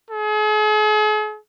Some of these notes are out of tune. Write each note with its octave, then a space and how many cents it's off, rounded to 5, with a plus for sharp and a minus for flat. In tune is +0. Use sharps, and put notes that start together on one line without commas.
G#4 +45